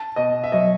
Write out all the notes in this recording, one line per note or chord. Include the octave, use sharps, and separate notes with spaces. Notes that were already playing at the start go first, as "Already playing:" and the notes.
Already playing: A5
B2 D#5
E5
F#3 D#5